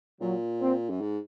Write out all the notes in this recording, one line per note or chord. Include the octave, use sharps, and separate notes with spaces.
A#2 F#3
C4
F#2
G#2